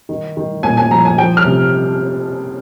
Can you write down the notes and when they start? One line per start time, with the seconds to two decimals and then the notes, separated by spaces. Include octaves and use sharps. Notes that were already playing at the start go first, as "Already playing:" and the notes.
0.09 D#3
0.37 D#3
0.63 A#2 G#5
0.77 G#5
0.91 F3 A#5
1.05 G#5
1.18 F3 G5
1.37 F6
1.45 C3